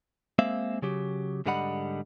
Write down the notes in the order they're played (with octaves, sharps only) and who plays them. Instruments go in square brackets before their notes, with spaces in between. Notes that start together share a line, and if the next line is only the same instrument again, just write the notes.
[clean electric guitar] G#3 A#3 C4 E5 F5
C#3 F#3 G4
G#2 D3 G3 D#5 F#5 B5